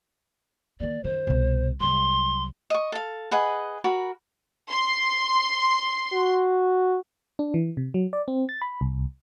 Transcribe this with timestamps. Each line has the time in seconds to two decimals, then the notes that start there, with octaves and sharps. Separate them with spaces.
0.80 D#3 A#3 D5
1.04 F#2 D#3 C5
1.27 C2 B2
1.80 C2 F#3 C6
2.70 D#5 C#6
2.92 A4 F5
3.31 G#4 B4 D#5 F#5
3.84 F#4 A#4 B5
4.70 C6
6.13 F#4
7.39 D4
7.54 E3
7.77 C3
7.94 F#3
8.13 D5
8.28 C4
8.49 A6
8.62 B5
8.81 C2